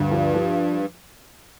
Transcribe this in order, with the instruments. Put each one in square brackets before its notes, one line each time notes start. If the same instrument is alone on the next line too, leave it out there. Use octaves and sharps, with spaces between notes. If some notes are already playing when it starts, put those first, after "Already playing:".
Already playing: [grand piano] D2 [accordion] G2
[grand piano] F3
F3